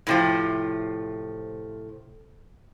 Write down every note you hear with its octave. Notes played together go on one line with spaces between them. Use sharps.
A2 C3 F3